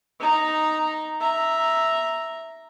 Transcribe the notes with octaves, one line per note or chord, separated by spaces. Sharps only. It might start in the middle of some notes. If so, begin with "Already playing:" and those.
D#4 A#5
E5 A#5